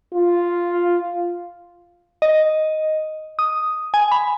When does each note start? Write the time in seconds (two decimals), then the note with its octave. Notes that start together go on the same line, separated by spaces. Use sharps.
0.14 F4
2.22 D#5
3.39 D#6
3.94 G#5
4.11 B5